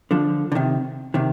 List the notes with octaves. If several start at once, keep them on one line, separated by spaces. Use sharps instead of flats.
D3 F3
D3
C3 D#3
C3 D#3